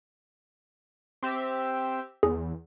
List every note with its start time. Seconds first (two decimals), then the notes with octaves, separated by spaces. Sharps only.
1.23 C4 G4 E5
2.23 E2 G#4